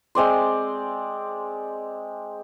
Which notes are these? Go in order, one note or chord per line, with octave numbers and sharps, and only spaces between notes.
G#3 C4 D5 C6